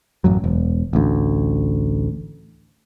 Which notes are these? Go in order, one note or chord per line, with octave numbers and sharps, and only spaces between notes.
A1 F#2 F#3
E1
A1 D2